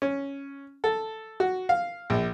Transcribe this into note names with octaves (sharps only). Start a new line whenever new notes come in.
C#4
A4
F#4
F5
A#1